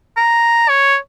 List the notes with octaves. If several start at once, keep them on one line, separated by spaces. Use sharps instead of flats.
A#5
C#5